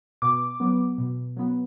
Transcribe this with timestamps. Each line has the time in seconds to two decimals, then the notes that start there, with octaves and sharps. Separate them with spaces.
0.22 B2 D6
0.60 F#3 B3
0.98 B2
1.37 F#3 B3